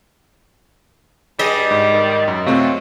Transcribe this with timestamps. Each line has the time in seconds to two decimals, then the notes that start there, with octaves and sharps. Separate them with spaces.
1.39 G2 G3 G#4 D#5 B6
1.71 G#2
1.92 D#3
2.28 F#2
2.46 C3 F#3 A3 C4 F4